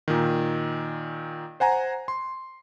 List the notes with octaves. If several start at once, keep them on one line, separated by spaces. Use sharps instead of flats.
A#2 D#3
C5 F#5 G#5 A#5
C6